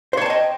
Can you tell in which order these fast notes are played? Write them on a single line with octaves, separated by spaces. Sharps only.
C5 C#5 A5 G5 D#5